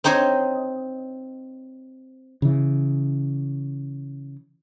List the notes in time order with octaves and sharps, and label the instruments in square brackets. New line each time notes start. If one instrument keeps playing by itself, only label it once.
[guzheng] C4 D#4 C5 C#5 D#5
[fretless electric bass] C#3 E3